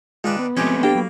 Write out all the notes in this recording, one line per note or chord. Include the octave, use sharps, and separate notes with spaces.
D#3 G#3 D4 F4 B4
B3
F3 G#3 A3 C4 C#4 G4 G#4
A#3 D4 G4 A4 G5
F#3 B5